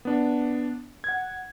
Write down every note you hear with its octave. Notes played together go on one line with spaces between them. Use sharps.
B3 D4
F#5 G#6